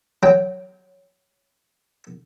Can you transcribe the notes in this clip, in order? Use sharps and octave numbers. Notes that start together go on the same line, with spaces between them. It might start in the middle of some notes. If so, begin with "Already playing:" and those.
F#3 G5